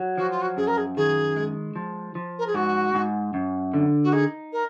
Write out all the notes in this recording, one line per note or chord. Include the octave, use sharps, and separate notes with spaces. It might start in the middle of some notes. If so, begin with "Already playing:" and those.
Already playing: F#3
F3 F#4
F4
F#4
F#2 G#4
A#4
G#4
D#3 G#4
G#3
F3
F3
A#4
G#4
G#2 F#4
G#2
F#2
D3
F#4
D#4 G#4
A#4